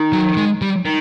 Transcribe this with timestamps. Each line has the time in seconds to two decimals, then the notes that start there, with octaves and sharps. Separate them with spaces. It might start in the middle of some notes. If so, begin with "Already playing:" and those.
Already playing: D#3
0.13 F#3
0.37 G#3
0.62 G3
0.85 D#3